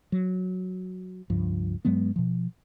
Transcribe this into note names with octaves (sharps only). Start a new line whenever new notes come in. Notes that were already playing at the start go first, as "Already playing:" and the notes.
F#3
C#2 G2 F3
G2 F#3 G#3 B3
B2 F3